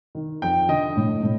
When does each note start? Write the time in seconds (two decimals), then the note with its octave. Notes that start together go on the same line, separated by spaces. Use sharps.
0.15 D#3
0.42 F2 G5
0.69 D3 D#5
0.97 A2
1.23 A2